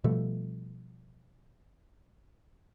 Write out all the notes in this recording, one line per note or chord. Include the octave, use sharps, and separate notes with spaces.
B2 F3 G3 A3